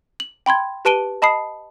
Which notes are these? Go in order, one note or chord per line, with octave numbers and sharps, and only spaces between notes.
F#7
G5 B5 C6 G#6
G4 B4 A5 D7 D#7 G7
D#5 A5 B5 D#6 C7